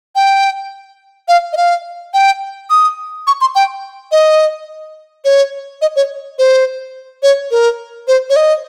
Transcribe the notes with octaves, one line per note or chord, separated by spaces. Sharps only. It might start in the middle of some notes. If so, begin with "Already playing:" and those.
G5
F5
D#5
F5
G5
D#6
C#6
C6
G5
D#5
C#5
D#5
C#5
C5
C#5
A#4
C5
C#5
D#5